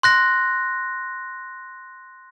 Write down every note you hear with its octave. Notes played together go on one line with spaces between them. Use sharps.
C6 F#6 A#6